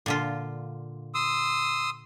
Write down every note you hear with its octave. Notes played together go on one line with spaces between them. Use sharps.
A#2 D3 F4
C6 D#6 E6